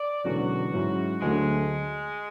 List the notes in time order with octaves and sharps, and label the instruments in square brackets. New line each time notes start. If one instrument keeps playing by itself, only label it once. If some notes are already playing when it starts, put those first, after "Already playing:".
Already playing: [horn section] D5
[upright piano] E1 E2 D3 F#3 C#4 [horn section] F#4
[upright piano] G#2 F#3 C#4 E4
[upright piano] D2 D3 F#3 A3 [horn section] G#3